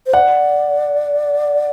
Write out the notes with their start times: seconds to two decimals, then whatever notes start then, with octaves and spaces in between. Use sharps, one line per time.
0.07 C5
0.13 D5 F#5